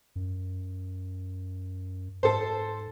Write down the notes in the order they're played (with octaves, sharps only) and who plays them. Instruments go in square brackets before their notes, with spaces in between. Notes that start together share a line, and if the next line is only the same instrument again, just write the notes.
[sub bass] F#2
[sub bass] G#2 [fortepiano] A4 C5